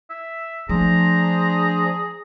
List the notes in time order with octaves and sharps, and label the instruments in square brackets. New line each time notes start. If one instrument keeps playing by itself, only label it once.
[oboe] E5
[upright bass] F3 A3 [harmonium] D4 C5 [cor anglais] G#4 [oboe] A#5